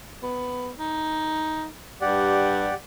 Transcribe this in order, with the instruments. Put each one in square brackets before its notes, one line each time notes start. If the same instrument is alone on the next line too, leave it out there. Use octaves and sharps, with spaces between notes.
[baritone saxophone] B3
D#4
[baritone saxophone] G2 [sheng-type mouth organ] G4 D5 F#5